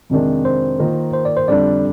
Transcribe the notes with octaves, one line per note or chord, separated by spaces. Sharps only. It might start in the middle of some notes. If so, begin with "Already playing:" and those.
F2 C3 D#3 G#3 D4
C5
D#3 A#3 F4 A#4
C5
D5
C5
F2 D3 G3 D4 D5